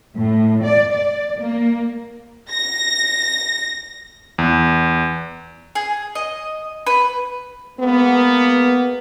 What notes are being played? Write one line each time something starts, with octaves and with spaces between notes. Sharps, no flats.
A2
D5
D5
A#3
A#6
E2
G#4
D#5
B4
G#3 A#3 B3